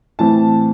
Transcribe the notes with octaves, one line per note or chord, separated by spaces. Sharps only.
A2 E3 C4 A5